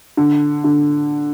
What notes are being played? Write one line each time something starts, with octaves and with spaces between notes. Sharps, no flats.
D3
D3